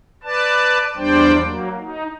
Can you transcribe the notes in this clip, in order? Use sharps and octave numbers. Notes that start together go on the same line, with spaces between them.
B4 D5 A5
E2 G3 D4 C5 D5 G5
F#3 A#3
D#4